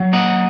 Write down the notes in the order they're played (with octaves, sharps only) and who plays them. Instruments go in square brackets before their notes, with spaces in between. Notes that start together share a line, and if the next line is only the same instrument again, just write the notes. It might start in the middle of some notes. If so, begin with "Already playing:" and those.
Already playing: [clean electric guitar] F#3
A#3 D#5 F#5